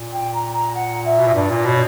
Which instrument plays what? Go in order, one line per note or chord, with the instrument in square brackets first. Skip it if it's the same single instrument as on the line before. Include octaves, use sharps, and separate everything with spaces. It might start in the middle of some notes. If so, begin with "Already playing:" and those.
Already playing: [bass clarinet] A#2
[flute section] G5
A#5
A#5
F#5
E5
[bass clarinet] B2
A#2
[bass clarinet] G2 [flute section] D5
[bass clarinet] A#2
[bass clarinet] B2 [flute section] C#5